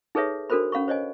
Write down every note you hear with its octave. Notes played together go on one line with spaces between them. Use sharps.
D#4 G#4 A4 B4 C#5 E5
D4 F#4 A4 A#4 C5 B5
C#4 F5 B5 C#6
C5 C#5 D#5 G#5